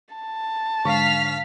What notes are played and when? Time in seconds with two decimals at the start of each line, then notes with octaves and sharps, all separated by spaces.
0.15 A5
0.85 G#2 D3 F5 C#6 F6 B6